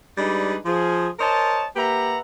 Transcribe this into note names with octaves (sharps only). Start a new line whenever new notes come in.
G3 G#3 D4 D#4 B4
F3 G#4
A#4 C5 C#5 D#5 A5
A#3 G4 B4 E5 F#5 A#5